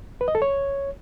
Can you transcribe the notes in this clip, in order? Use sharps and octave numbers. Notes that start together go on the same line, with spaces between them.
B4
D#5
A4
C#5